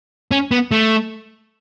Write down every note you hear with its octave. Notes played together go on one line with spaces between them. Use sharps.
C#4
B3
A3